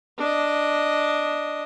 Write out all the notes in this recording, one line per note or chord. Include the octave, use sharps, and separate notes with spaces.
D4 D#5